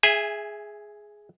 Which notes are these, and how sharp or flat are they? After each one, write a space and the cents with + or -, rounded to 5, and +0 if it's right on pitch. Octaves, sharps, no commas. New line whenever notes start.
G#4 +5 E5 +0 G#5 -25